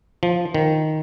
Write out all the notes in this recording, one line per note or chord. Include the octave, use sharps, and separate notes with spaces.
F3
D#3